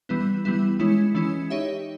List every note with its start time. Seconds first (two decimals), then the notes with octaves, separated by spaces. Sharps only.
0.09 E3 G3 B3 E4
0.45 E3 G3 B3 E4
0.79 E3 G#3 C#4 E4
1.14 E3 G#3 C#4 E4
1.50 D#4 G4 C#5 E5